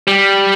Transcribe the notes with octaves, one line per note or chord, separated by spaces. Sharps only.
G3